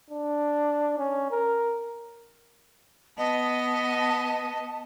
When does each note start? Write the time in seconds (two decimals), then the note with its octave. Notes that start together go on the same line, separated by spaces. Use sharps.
0.10 D4
0.98 C#4
1.31 A#4
3.18 B3 D#5 A5